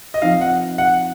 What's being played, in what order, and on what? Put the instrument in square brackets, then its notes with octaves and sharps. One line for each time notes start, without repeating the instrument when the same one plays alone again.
[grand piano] D#5
[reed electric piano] F3 C4 D#4 [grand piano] F5
[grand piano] F#5
F#5